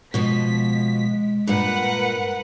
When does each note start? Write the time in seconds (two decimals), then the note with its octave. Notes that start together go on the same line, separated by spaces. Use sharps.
0.14 B2 F3 G#3 B6
1.47 G2 A#2 A#4 B4 F#5